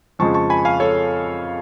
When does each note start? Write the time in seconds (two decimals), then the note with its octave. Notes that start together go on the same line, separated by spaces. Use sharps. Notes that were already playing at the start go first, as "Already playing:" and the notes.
0.19 F2 C#3 F3 G#3 A5 C#6
0.34 A5 C#6
0.50 G#5 B5
0.65 F5 G#5
0.80 A4 C#5